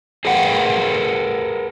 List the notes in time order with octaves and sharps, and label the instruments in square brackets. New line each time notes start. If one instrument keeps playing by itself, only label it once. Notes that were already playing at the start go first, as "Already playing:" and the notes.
[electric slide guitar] G#4 A#4 B4 F#5 G5